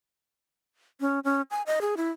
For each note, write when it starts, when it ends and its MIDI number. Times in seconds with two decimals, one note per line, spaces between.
1.00 1.20 61
1.24 1.42 61
1.51 1.62 80
1.66 1.79 75
1.81 1.95 68
1.97 2.09 64